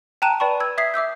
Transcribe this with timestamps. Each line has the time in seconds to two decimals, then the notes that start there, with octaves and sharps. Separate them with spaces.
0.22 G5 A5 A#5 F#6 D#7 E7
0.40 B4 D5 G5 A5 B5 C#6
0.60 E6 G#6
0.78 E5 D#6 G#6 B6 C7
0.94 E5 D6 E6 G6